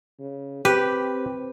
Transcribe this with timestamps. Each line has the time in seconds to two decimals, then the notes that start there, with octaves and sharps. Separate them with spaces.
0.20 C#3
0.65 C4 G4 B4